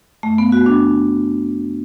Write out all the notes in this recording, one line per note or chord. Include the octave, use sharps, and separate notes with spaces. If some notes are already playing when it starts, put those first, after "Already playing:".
F#2 A3
B3
C#3 F#4
D4